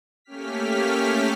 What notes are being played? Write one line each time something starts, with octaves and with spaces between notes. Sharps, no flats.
A3 A#3 C#4 G4 F6 B6